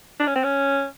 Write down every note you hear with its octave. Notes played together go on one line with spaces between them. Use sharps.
D4
C#4
C4
C#4